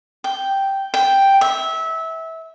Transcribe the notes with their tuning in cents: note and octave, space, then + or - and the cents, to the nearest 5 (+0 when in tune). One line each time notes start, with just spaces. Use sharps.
G5 -5
G5 +0
E5 -20